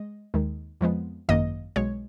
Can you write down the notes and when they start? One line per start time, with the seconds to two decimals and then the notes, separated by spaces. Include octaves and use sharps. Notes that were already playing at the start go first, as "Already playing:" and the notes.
Already playing: G#3 D#5
0.34 D#2 D#3 G#3
0.81 F2 F3 G#3 B3
1.29 G#1 F#2 D#3 A#3 D#5
1.76 B1 B2 G#3 C#5